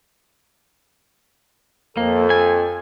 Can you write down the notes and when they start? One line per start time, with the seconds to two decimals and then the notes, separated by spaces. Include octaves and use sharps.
1.97 F2 A#3 A4
2.30 G#5